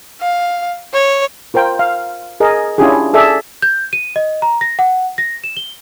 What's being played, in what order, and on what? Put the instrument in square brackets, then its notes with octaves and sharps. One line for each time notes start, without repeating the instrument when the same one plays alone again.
[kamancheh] F5
C#5
[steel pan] F4 A#4 C5 G5
F5
G#4 A#4 D#5
C#4 D4 E4 F4 G4 G#4
G#4 A4 D5 E5
[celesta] G6
D#7
D#5
A#5
A#6
F#5
A#6
E7
G7